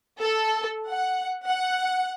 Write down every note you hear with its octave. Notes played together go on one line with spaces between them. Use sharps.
A4
F#5
F#5